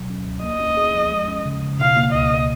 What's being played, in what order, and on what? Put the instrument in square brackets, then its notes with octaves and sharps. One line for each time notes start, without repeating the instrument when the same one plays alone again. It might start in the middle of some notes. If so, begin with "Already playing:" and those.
Already playing: [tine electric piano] B2 F#3
C#4
C#2
[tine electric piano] A#3 [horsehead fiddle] D#5
[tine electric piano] C#4
G#4
F3
G#3
C#4
C#3
C#3
[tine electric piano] B2 [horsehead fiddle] F5
[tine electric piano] A#3
[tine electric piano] C#2 [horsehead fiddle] D#5